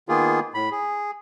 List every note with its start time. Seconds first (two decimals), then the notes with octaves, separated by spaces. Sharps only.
0.09 D#3 A#3 B3 F4 G#4
0.54 A2 B5
0.71 G#4